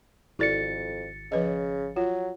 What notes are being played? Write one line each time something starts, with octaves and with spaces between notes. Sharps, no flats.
G#1 F2 E4 A4 D5 A6 C#7
C#3 F3 B4 D#5
F#3 F4